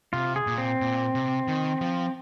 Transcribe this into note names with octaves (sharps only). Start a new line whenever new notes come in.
C3 F4
G#4
A#2
C4
A#2
C3
D#3
F3